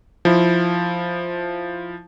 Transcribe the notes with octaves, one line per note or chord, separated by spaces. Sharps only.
F3 E4